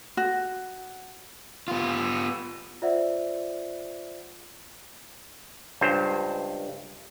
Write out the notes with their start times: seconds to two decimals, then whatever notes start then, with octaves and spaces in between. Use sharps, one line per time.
0.17 F#4
1.68 B3 F4
2.82 F4 C5 D5 E5 F#5
5.81 C#2 G2 C5